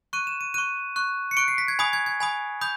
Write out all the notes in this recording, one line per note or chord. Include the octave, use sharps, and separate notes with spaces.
C#6 F#6 D#7
E7
D#7
C#6 F#6 D#7
C#6 F#6
C#7
C#6 F#6 D7
C7
B6
G#6
G#5 B5 D#6 G#6
G#6
G#6
G#5 B5 D#6
B5 D#6 G6